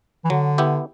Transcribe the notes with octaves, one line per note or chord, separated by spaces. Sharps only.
E3
D3 F#3
B3 E4 G4